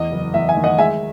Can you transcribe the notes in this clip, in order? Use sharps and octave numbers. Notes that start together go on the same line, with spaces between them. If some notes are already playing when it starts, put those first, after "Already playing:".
Already playing: E2 D#5
F#1
E2 E5
E5 G#5
D#3
D#5 F#5
G#3 E5 G#5